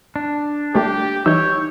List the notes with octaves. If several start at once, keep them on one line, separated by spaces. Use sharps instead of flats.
D4
G3 A3 A#3 G4
E3 G3 D#4 C#5 E6 G6